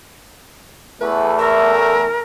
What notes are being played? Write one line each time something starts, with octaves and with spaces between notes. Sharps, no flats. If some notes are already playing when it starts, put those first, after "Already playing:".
E2 A3 B4
A#4 E5